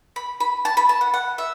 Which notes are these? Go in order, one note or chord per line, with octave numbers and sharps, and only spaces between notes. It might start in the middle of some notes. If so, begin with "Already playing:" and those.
B5
B5
A5
B5
A5
F#5
F#5
E5